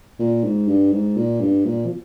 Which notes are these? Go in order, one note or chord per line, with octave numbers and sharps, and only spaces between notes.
A#2
G#2
G2
G#2
A#2
G2
A#2
F3